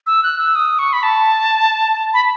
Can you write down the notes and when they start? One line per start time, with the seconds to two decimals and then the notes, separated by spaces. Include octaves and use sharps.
0.07 E6
0.23 F#6
0.39 E6
0.55 D#6
0.79 C#6
0.93 B5
1.03 A5
2.14 B5